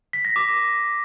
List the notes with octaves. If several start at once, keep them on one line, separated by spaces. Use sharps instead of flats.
B6
A#6
D6